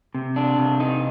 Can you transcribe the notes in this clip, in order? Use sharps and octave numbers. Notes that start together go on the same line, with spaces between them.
C3
D4
C3
D#4